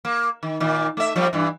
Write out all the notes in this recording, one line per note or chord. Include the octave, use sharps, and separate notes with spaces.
A#3
D#3
A#2 D#3
A3 E5
F3 G3 A#3
G2 E3